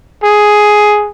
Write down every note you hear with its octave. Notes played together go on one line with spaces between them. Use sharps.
G#4